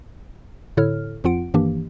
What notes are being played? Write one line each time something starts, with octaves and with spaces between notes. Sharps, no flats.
A2 D3 E4 A4 C#5 F6
F2 F3 C4 F4 F#5 D7
G2 D#3 E3 A#3 D4 G4